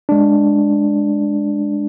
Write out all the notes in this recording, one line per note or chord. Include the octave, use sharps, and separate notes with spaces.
G#3 D4